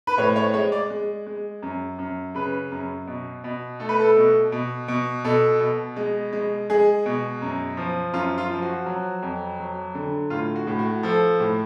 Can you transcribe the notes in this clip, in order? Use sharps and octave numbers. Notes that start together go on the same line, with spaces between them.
B4
A2 C#5
C#5
G#3 C#5
D5
G#3
G#3
F#2
F#2
C#3 B4
F#2
B2
B2
A3 A4
B4
A4
B2
B2
B2
B2 A4
B2
G#3
G#3
G#3 G#4
B2
F#2
F3
F#2 F4
F4
F3
F#4
F#3
F2
F#3
D3
A2 F4
F#4
A2
F#4
F3 A4
A2